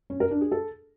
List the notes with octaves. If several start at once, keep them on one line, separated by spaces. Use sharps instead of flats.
C#4
A#4
D4
G#4
A4